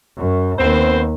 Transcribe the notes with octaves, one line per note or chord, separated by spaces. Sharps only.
F#2
D#2 B3 C4 C5